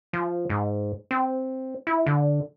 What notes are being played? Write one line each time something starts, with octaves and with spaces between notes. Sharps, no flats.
F3
G#2
C4
E4
D3